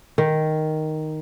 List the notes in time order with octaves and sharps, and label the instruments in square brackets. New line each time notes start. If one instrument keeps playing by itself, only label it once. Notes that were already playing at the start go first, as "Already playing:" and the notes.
[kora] D#3